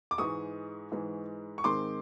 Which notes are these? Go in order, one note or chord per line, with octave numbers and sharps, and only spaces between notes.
D6
G#2 E3 G#3 C#6 D#6
G#2 E3 G#3
C#6
G#2 D#3 G#3 C4 D#4 C6 D6